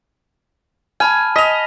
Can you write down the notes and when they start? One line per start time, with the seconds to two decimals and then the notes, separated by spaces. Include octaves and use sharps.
1.00 G#5 A5 B5 F6
1.36 D#5 B6 F7